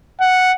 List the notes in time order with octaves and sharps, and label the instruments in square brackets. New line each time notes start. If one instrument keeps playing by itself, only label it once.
[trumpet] F#5